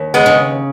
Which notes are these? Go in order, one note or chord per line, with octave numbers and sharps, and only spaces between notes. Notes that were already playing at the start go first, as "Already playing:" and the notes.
Already playing: D#2
G#3 B3
C#3